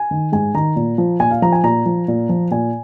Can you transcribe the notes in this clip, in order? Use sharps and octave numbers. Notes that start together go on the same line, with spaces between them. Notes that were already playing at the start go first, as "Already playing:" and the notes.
Already playing: G#5
D#3
G#2 G#5
D#3 A#5
A#2
F3
A#2 G#5
F5
F3 A#5
G#5
A#2 A#5
F3
A#2
F3
A#2 G#5